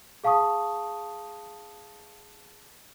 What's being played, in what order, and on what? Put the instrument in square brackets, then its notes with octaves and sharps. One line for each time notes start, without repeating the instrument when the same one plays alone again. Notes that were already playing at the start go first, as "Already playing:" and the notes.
[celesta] G#4 F5 A5 C#6 D#6